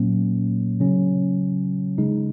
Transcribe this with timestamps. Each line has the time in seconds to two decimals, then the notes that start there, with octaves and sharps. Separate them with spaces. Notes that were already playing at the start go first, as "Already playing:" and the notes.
Already playing: A#2 F#3 A#3 C#4
0.80 C#3 F#3 C#4
1.98 C#3 G#3 D#4